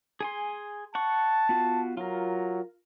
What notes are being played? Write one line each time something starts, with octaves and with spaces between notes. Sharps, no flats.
G#4 G#5 C6
F#5 A5 C#6
B3 F4 F#4
F#3 F4 A#4